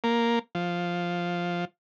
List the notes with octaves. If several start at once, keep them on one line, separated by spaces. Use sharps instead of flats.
A#3
F3